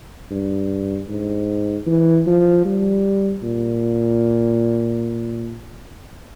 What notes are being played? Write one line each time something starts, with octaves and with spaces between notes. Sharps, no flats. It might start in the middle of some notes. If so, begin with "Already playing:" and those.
G2
G#2
E3
F3
G3
A#2